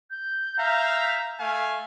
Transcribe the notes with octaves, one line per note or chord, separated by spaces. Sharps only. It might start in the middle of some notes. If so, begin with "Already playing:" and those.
G6
E5 F5 A#5
A3 F5 G#5